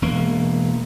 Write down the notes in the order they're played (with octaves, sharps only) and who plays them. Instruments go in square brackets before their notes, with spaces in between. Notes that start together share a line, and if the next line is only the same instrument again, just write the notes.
[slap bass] E1 A#3